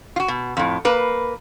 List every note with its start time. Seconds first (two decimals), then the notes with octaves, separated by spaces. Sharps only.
0.16 F4 F#4
0.28 B2
0.57 F2 A2
0.85 A#3 B4